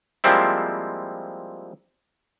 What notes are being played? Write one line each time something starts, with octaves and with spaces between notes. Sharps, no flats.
F3 G3 G#3 A#3 C4 E4